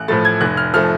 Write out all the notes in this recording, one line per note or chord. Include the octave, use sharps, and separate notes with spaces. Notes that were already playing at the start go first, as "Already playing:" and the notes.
Already playing: A1 F#6
A2 F3 A3 A6
G#6
F1 F#6
F6
F3 A3 F6